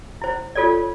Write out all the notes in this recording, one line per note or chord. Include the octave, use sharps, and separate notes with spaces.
E4 C5
F4 A4 C#5 D5